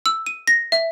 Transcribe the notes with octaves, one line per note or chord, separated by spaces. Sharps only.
E6
D#7
A#6
E5